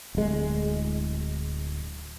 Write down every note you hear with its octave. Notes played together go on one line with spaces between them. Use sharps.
D1 G#3